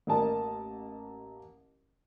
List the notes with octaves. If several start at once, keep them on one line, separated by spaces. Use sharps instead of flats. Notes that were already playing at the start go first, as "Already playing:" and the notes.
A1 A#3 A#4 D#5 A5